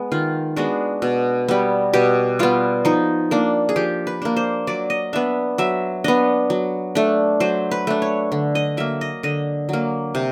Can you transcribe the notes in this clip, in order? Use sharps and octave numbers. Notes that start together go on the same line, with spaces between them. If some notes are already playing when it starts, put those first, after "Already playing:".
Already playing: G#3 B3
D#3 F4
G#3 B3 D4 F#4
B2
G3 B3
B2 G4
G3 B3 F4
F3 D#4
A#3 D4
G#4
F3 G4
B4
A#3 D4
C5
F#3 D5
D#5
B3 D4 E5
F#3 E5
B3 D4 D#5
F#3
A3 D4
F#3 C5
B4
A3 D4
C#5
D3
D#5
F#3 A#3 E5
D#5
D3 D#5
F#3 A#3
C3